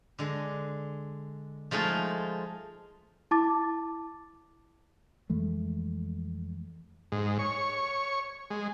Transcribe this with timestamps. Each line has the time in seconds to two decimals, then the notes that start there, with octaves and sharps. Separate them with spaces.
0.19 D3 G#3
1.71 F3 G#3 A3 D#4 F4
3.31 E4 A5 D6 A6
5.30 F2 E3 G#3 A3
7.12 G#2
7.39 C#5
8.50 G#3